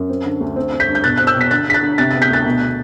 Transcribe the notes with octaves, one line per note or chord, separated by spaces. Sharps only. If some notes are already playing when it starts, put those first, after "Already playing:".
Already playing: F#2
C4
D3
D2
C4
C4
G6 B6
G2
G6
B2 F#6 A6
C4 F#6
E6 G6
B2
B6
D3 F#6 A6
D3 B6
F#6 A6
D3
C3 F#6 A6
B3 A6
G6 B6
D2 F#6 A6
B2